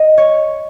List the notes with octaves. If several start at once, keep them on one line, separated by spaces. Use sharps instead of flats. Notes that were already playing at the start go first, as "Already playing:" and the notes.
Already playing: D#5
C#5